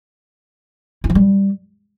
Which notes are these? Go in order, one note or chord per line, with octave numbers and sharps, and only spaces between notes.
E4
F3
G3